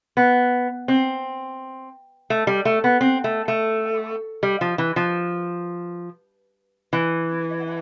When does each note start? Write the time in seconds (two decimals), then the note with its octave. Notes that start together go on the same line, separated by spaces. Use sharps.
0.17 B3
0.88 C4
2.30 A3
2.47 G3
2.65 A3
2.84 B3
3.01 C4
3.24 A3
3.48 A3
4.43 G3
4.61 F3
4.78 E3
4.96 F3
6.93 E3